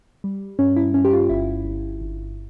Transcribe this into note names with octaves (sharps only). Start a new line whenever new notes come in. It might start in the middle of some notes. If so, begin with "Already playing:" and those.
G3
G2 C#4
E4
G2 C#4
G4
F4
G1 E4
G1
G1